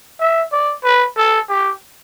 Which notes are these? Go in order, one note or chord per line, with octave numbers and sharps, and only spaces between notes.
E5
D5
B4
A4
G4